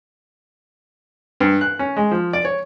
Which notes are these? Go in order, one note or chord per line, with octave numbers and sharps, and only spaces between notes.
G2
F#6
C#4
G#3
F3
D5
C#5